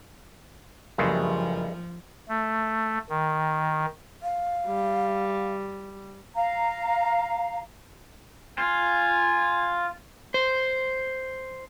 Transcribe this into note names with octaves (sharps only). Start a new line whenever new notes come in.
F#1 G2 F3 G#3 A3 G4 E5
A3
D#3
F5
G3
F5 A#5
F4 G#5
C5